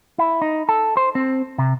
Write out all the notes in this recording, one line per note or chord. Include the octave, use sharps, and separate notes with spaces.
E4
D#4
A4
C5
C4
C3